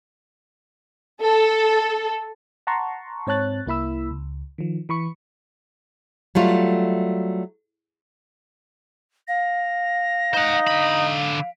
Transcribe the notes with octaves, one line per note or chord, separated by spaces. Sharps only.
A4
F#5 A5 A#5 C6 C#6
G#2 C4 C#5 A5 F#6 A6
C2 A#3 E4 B5 E6
C#2
D#3 F3
E3 B5 C#6 C#7
F#3 G3 A3 F4
F5 A#6
D#4 C5 F#5
D3 B5